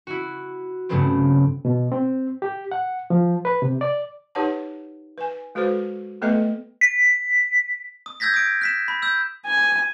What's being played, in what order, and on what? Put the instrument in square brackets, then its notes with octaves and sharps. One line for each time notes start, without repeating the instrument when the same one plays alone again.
[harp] E4 F#4
G2 C#3 F#3 A3 B3 C4
[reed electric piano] B2
C4
G4
F#5
F3
B4
C3
D5
[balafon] D#4 G4 B4 C#5 F#5 A5
B4 G#5
G#3 F#4 A4 B4 C5
A3 B3 A4 B4 D#5 E5
[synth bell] B6
[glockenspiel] D#6
E6 G6 G#6 A#6 B6
D#6 D7
F#6 B6 E7
B5
E6 G6
[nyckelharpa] G#5